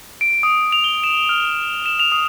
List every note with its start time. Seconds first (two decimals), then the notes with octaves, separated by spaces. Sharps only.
0.21 D7
0.43 D#6
0.72 F7
0.84 G7
1.04 E7
1.29 F6
1.86 E7
2.00 F7
2.12 D#6